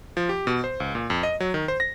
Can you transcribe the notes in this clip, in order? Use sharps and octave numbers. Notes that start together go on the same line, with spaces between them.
F3
G4
B2
C5
C#2
A#2
F2
D#5
F#3
D#3
C5
A#6